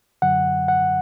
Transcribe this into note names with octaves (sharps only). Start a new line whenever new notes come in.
F#2 D3 F#3 F#5
F#5